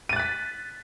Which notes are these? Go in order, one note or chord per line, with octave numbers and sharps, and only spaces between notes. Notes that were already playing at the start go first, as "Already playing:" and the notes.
F#6 A6 B6 D#7